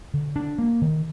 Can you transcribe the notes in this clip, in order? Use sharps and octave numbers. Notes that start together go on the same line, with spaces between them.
D3
D4
A#3
D#3